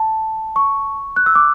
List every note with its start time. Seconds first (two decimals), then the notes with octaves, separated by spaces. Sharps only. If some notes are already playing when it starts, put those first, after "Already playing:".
Already playing: A5
0.56 C#6
1.16 F#6
1.26 E6
1.35 D6